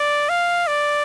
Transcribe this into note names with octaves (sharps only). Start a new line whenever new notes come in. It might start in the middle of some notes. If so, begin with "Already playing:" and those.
Already playing: D5
F5
D5